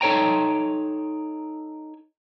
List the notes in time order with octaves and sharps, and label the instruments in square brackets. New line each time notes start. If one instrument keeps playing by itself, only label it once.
[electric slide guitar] D#4 A4 C#5 G5 A#5